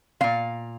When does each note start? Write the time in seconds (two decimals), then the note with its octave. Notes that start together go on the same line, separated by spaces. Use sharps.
0.21 G#3 F5
0.24 A#2